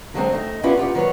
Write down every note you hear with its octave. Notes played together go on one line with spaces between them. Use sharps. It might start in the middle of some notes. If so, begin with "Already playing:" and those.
D3 F#3 G#3 C4
A3 D#4
B3 C#4 E4 F4 G4 B4
F4 G4 F#5
D#3 F#3 B4 C#5